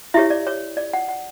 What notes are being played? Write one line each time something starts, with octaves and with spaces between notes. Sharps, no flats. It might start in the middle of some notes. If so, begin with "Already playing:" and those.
E4 G4 C#5 E5
D5
C#5
D5
F#5
F#5